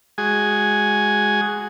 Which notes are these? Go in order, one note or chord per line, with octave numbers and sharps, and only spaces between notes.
G#3 F#4 G#4 G#5